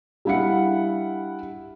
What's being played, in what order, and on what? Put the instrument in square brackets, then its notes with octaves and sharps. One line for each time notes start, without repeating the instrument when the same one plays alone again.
[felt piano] G3 D4 E4 F5 F#5 C#7